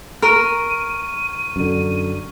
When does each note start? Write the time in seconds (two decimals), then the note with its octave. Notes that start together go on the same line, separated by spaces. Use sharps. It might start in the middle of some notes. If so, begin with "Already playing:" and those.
0.22 A#4 A#5 C#6 F6 D#7
1.56 F#2 D3